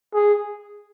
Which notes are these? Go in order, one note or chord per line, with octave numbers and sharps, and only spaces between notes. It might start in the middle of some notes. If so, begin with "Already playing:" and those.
G#4